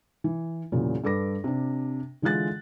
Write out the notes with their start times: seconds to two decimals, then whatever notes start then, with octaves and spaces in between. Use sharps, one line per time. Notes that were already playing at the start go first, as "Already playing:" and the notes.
0.24 E3
0.72 E2 A#2 C#3 F#3
1.04 G2 A4 B4 D6 A#6
1.44 C3 D4
2.22 D3 E3 G#3 F4 F#6 A6